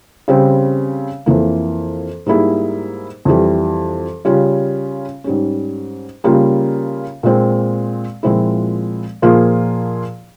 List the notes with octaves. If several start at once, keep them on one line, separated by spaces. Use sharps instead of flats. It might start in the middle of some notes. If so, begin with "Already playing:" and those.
C#3 G3 C4
F2 E3 A#3
G#2 G3 A#3 E4 G#4
F2 E3 G3
C#3 G3 C#4 F4
G#2 G3 C#4
C#3 G3 A#3 F4
A#2 G#3 C4
A#2 F3 G#3 C4 E4
A#2 F3 A#3 F4 G#4